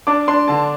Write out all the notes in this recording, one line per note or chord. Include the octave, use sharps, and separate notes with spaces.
D4 D6
D4 C6
D3 A5